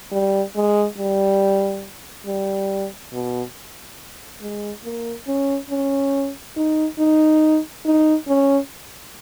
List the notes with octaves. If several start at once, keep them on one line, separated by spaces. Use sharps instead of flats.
G3
G#3
G3
G3
B2
G#3
A#3
C#4
C#4
D#4
D#4
D#4
C#4